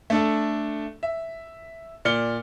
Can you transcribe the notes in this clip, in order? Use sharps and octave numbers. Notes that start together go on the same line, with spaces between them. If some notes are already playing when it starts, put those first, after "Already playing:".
A3 D4 A4
E5
A#2 D5 F6 C#7 G7